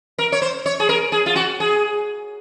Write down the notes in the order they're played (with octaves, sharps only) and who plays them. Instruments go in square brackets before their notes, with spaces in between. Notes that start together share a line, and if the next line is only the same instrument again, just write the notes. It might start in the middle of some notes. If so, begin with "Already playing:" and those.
[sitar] A#4
C#5
C5
C#5
G#4
A#4
G#4
F4
F#4
G#4